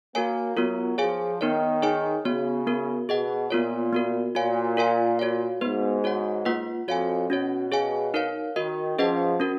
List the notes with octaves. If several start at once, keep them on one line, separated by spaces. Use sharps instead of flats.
A#3 F#4 A#4 C#5 G#5
F#3 B3 F4 A#4
F3 G#4 C#5 F5 G#5
D#3 B3 D#4 A#4 C#5
D#4 G#4 C#5 G#5
C#3 B3 F#4 C#5
B3 F#4 A#4
B2 G#4 D#5 F#5
A#2 B3 F4 A#4 C#5
B3 F#4 A#4
A#2 F#4 C#5 F5 G#5
F4 A#4 F5 G#5
F#4 C#5 F5
G#2 B3 F#4 B4
F#4 C#5 F#5
A#3 F4 B4 F#5
F2 F#4 C#5 F5 G#5
B2 C#4 F#4 C#5
G#4 C#5 F5 G#5
D#4 A#4 C#5 F5
D#3 F#4 A#4 D#5
F3 C#4 G#4 B4 D#5 F#5
C#4 F#4 A#4